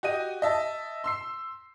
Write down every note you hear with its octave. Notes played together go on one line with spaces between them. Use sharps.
F#4 G4 D#5 D#7
D#5 E5 A5
C6 E6 C7